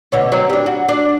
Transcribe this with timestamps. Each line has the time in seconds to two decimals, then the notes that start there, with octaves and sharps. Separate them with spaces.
0.12 B2 D3 C#4
0.32 F#3 C4 C#5
0.50 G3 D4
0.66 F#4
0.89 D4